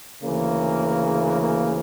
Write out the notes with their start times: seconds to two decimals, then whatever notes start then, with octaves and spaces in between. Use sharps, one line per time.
0.24 D2 C#3 E3 A#3
1.41 A#3